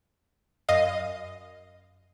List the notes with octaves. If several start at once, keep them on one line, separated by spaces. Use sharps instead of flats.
F#2 D#5 F5